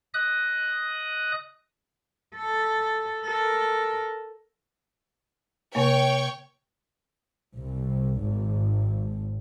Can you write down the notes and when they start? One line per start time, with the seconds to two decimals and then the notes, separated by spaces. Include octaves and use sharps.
0.14 D#5 D#6 F#6
2.35 A4
3.23 A4 A#4
5.75 C3 A#3 C#5 G5 C#6
7.58 C2
8.22 G#1